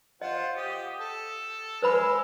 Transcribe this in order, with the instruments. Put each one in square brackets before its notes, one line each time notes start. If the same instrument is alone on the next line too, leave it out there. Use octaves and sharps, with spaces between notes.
[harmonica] F4 C5 F#5 [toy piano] D#5
[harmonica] G4 D#6
A4
[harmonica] G#3 E6 [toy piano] B4 C5 B5